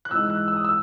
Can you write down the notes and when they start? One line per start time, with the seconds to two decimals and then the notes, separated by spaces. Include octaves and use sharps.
0.05 F#6
0.11 G#2 E3 G#3 D#4 E6
0.30 F#6
0.48 E6
0.57 D#6
0.65 E6